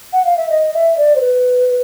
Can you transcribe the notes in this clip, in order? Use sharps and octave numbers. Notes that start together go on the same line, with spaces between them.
F#5
F5
E5
D#5
E5
D5
C5
B4